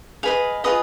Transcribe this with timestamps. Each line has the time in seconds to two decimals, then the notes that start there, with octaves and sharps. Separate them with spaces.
0.23 G#4 B4 D#5 F5
0.64 F4 G#4 B4 D#5 D#6